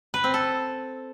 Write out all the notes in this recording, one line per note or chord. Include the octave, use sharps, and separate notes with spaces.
B4
C4
A4